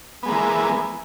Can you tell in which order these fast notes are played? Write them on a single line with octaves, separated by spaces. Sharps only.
B3 G#3 A#3 E3